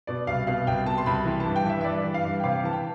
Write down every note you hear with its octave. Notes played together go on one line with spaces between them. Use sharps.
B2 D5
C2 F5
B2 F5
C2 G5
B2 A5
C6
C2 B5
E3 C6
A5
G2
G5
E3 E5
E5
G2 D5
E3
F5
G2
G5
C3 F5
E3 A5
G5